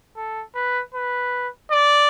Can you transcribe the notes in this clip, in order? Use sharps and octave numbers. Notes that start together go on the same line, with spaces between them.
A4
B4
B4
D5